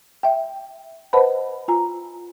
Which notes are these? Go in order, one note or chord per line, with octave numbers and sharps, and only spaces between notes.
E5 G5
B4 C5 D#5 F#5 A5 B5
F4 G#5 A#5